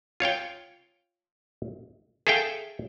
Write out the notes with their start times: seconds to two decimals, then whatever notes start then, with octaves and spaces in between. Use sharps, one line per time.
0.20 F4 C#5 F5 G5
2.27 G#4 A4 E5 F5 G5